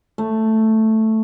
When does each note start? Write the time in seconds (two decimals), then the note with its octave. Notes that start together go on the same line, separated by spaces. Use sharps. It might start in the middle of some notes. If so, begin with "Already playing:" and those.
0.18 A3